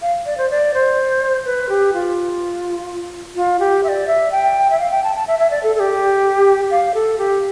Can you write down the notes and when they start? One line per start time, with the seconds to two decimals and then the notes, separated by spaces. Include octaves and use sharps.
0.02 F5
0.26 D5
0.38 C5
0.50 D5
0.74 C5
1.45 B4
1.69 G4
1.93 F4
3.36 F4
3.59 G4
3.84 E5
3.88 D5
4.07 E5
4.32 G5
4.70 E5
4.79 F5
4.91 G5
5.04 A5
5.16 A5
5.27 E5
5.39 E5
5.51 D5
5.63 A4
5.75 A4
5.80 G4
6.71 F5
6.94 A4
7.18 G4